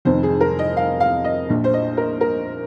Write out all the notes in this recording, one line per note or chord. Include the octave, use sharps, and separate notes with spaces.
F1 F2 D#3 C5
G#4
A#4
D#5
F5
F5
D#5
A#1 A#2
C5
D#5
A#4
A#4